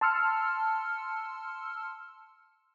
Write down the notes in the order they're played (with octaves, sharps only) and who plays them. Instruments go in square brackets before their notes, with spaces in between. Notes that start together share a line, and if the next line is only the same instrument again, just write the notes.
[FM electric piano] A5 C6 E6 F6 C#7